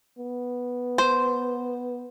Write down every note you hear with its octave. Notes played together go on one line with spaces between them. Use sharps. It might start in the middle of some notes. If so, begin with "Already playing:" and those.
B3
C5